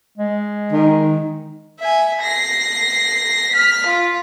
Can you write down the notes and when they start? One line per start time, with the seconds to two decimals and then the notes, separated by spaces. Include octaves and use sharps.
0.18 G#3
0.72 D#3
1.80 E5 G#5
2.21 A#6 C7
3.52 F6 B6
3.86 F4